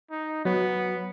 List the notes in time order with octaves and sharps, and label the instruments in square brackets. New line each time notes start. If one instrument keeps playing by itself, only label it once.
[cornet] D#4
[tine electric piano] F#3 [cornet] B3